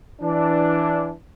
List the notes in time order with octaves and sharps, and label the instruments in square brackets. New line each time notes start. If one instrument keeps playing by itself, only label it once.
[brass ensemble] E3 D4